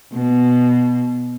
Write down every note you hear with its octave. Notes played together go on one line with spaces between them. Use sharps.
B2